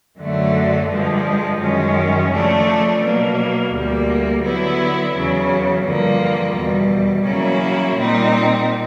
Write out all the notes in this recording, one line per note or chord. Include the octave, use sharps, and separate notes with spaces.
F#2 D3 F#3 A3
G2 D3 F3 G#3
F#2 D#3 G#3 C#4
C#3 F3 A3 D4
B2 F#3 A#3
D2 D3 G3 A#3
D3 F#3 B3 E4
E2 C#3 F#3
G2 D3 F3 A#3
E2 B2 G3
C#3 F#3 A#3 C#4 E4
A#2 G3 C4 D#4